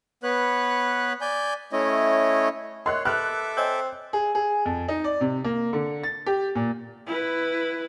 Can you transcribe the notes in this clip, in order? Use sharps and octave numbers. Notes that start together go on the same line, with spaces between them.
B3 B4 C#5 F#6
D5 G#5 G6
A3 C#4 E4 C#5 D#5
A#4 C#5 D#5 C6 F#6
A4 B4 E5 B5 D6 F#6
C4 C#5 D#5 G#5
G#4
G#4
F2
D#4
D5
C3
A#3
D3
A6
G4
A#2
E4 B4